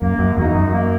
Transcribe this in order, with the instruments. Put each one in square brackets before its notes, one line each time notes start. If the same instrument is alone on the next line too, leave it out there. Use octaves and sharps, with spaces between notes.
[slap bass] F#2 [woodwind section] A#3
[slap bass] F#2
[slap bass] E2 [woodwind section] D#4 F#4
[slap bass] F#2
[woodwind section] A#3